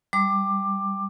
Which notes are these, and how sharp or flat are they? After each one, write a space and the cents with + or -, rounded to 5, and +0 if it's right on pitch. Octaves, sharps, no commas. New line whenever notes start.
G3 +0 D6 +15